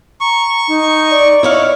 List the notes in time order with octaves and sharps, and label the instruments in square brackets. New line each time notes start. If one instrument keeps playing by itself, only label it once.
[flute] A#5 [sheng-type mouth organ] C#6
[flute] D#4
[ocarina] D5
[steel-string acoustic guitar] E4 C#5 F5 [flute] D#5